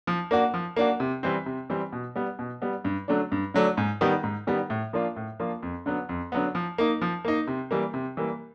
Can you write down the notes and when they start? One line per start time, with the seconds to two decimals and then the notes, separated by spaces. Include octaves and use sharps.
0.07 F3
0.31 A#3 D4 F#4
0.54 F3
0.76 A#3 D4 F#4
1.00 C3
1.23 E3 G3 C4
1.46 C3
1.70 E3 G3 C4
1.92 B2
2.16 G3 B3
2.39 B2
2.62 G3 B3
2.85 G2
3.08 D3 F#3 A3 D4
3.32 G2
3.54 D3 F#3 A3 D4
3.77 G#2
4.01 D#3 G3 B3
4.24 G#2
4.47 D#3 G3 B3
4.70 A2
4.93 F3 A#3 D4 F4
5.16 A2
5.40 F3 A#3 D4 F4
5.63 F2
5.86 D3 F#3 B3
6.09 F2
6.32 D3 F#3 B3
6.55 F3
6.78 A#3 D#4
7.02 F3
7.25 A#3 D#4
7.47 C3
7.71 E3 G3 A#3
7.94 C3
8.17 E3 G3 A#3